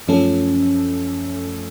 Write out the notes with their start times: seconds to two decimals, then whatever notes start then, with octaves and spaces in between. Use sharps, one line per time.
0.08 F#2 F3 A3 C#4 A4